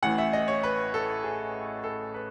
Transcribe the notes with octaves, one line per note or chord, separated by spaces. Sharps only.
A1 A2 E3 F#5
E5
D#5
C#5
B4
A4
G#4
A4
B4